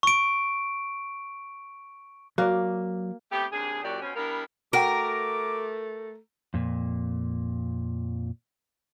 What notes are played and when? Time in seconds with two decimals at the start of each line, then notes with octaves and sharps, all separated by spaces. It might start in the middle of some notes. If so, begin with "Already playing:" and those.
0.03 C#6 D7
2.38 F#3 A#3 F#4 D5
3.31 A3 B3 C4 G4
3.52 D#2 C3 D4 G#4
3.83 F#2 A#2 F#3 F#4 G4 D5
4.02 B2 C4 C#4
4.16 G3 B3 D4 E4 A#4
4.73 A3 F#4 A#4 F#5 G5 D6
6.54 F2 A#2